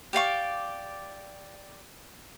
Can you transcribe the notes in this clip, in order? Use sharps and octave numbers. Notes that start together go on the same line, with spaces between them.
G4 D5 F5 C#6